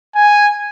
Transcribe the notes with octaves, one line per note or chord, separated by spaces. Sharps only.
G#5